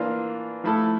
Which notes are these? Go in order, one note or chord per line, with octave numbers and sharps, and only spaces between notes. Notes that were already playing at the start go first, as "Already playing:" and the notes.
Already playing: E3 A#3 D4 F4
F3 A3 E4 A4